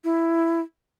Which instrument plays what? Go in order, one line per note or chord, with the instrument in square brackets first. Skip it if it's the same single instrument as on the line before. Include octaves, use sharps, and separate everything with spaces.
[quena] E4